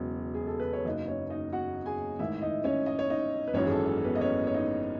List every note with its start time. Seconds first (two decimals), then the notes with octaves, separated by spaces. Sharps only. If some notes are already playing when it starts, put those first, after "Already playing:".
Already playing: E1 E2 C#3 F#3
0.34 G#4
0.47 A4
0.60 B4
0.73 C#5
0.85 F#1 F#2 C#3 D#4 D#5
1.08 C#4 C#5
1.30 D#4 D#5
1.52 F#4 F#5
1.86 G#4 G#5
2.19 A1 G#2 D#3 E4 E5
2.42 D#4 D#5
2.64 C#4 C#5
2.86 D#5
2.99 C#5
3.10 D#4 D#5
3.48 B4
3.54 G#1 F#2 E3 C#4 C#5
3.67 G#4
3.71 A4
3.88 A4
4.04 B3 B4
4.15 D#5
4.21 C#4 C#5
4.47 C#5
4.54 D#4 D#5